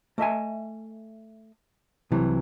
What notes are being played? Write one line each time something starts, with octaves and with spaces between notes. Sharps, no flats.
A3 D#5 E5 G#5
C2 C3 E3 F#3